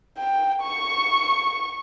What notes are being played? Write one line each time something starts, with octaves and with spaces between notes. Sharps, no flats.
G5
C#6